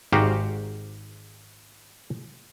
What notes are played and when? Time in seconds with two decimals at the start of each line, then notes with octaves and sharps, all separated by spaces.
0.12 G#1 G#2 F#4 G4 F5 A#5